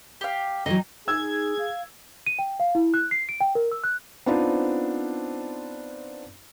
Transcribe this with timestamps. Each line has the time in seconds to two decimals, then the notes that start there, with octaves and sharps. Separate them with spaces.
0.21 G4 F5
0.66 D3 E3 F#3 D#4
1.08 D#4 G#4 E6 G#6
1.59 F5
2.26 D#7
2.39 G5
2.60 F5
2.75 E4
2.94 F#6
3.11 C7
3.29 D7
3.41 G5
3.55 A#4
3.72 E6
3.84 F#6
4.26 B3 C4 D4 D#4 F4 C5